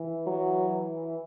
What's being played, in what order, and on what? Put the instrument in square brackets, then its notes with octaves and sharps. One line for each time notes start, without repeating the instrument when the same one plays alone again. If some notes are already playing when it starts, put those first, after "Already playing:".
Already playing: [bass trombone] E3
[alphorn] F#3